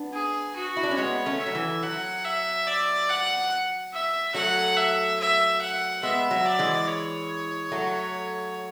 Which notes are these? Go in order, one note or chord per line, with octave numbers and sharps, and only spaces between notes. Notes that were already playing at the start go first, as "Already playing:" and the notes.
Already playing: B3 D4
G#4
F#4
E4
D4
C#4
G#3 B3 C#5
A3 C#4
E5
F#3
E3
F#3 F#5
E5
D5
F#5
E5
F#3 A3 F#5
E5
E5
F#5
G#3 B3 E5
F#3
D5
E3 G#3
C#5
F#3 A3